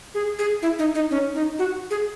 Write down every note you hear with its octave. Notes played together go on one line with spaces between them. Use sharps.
G#4
G#4
E4
D#4
D#4
C#4
D#4
F#4
G#4